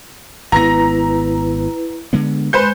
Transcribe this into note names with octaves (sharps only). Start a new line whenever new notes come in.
G#1 B3 E4 B4 A#5 A#6
D3 G#3 B3
G#3 B4 C5 G6